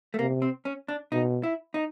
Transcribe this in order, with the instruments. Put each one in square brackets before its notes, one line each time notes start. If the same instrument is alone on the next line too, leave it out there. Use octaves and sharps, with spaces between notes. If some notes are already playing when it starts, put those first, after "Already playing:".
[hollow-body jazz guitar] A3
[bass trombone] C3 [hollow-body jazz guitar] A#3
[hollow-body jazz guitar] C4
C#4
D4
[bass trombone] B2 [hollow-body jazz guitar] D#4
[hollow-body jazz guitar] E4
D#4